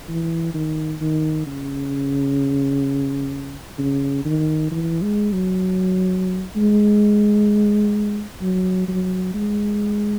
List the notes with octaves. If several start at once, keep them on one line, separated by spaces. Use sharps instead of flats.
E3
D#3
D#3
C#3
C#3
D#3
E3
G#3
F#3
G#3
F#3
F#3
G#3